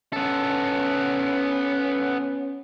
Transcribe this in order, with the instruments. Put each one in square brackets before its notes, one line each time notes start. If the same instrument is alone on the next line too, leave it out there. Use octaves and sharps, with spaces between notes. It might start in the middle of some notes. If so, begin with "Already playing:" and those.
[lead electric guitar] B3 A4 [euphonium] C#4